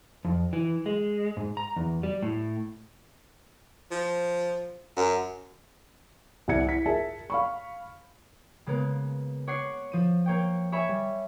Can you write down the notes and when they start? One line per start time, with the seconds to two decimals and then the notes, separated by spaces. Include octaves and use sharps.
0.25 F2
0.53 E3
0.86 G#3
1.37 G#2
1.57 A#5
1.76 E2
2.03 G3
2.23 A2
3.91 F3
4.97 F#2
6.48 C2 G4 D5 F#5 G#6 C#7
6.66 E4 B6
6.86 F4 G#4 A#4 E5 A5
7.30 F5 B5 C#6
8.67 C#3 G#3 A#3 B3
9.48 C#5 F#5 D6 F#6 C7
9.92 F3 D#7
10.26 A#3 C#5 G5
10.72 C#5 E5 G#5 B5
10.89 G3